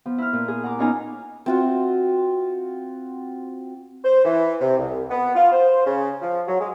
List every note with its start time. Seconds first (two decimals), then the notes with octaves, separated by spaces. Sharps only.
0.06 F3 B3
0.18 E4 F6
0.33 A#2
0.48 G#4
0.64 F#5 A#5 D6
0.79 B3 C#4 D#4 F4 G#5 A#5
1.46 C4 F4 F#4
4.04 C5
4.24 E3
4.60 C3
4.78 C2
5.10 B3
5.35 F4
5.52 C5
5.86 C#3
6.21 F3
6.47 F#3
6.60 G#3